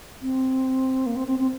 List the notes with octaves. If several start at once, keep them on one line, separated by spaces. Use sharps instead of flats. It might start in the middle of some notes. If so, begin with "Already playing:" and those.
C4
A#3
C4
C4
C4